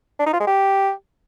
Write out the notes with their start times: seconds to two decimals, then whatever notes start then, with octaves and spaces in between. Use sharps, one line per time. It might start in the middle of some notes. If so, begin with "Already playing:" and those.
0.19 D4
0.26 D#4
0.33 F4
0.40 G#3
0.47 G4